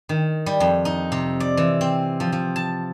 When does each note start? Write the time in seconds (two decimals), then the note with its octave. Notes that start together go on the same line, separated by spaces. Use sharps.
0.09 D#3
0.46 G3
0.60 F2
0.85 D#4
1.12 C3
1.40 D5
1.57 E3
1.81 C4
2.20 F3
2.32 F3
2.56 A5